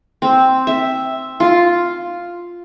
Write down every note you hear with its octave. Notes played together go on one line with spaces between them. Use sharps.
C4
E5
F4